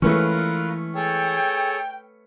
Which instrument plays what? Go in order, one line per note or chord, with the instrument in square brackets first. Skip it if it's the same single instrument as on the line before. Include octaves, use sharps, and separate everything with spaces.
[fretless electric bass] E3 G#3 [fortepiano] A3 B3 C#4 [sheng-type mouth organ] F4 A#4 B4
[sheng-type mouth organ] G#4 A4 C#5 [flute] G5